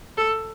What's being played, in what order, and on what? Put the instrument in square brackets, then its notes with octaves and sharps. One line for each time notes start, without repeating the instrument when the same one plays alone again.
[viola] A4